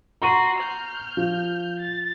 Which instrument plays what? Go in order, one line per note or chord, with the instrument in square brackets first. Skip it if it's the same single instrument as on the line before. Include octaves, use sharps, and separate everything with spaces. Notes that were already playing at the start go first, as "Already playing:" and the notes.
[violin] F#4 C6 [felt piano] A#5 C#6 D#7
[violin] F6 G6
[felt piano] F3
[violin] A6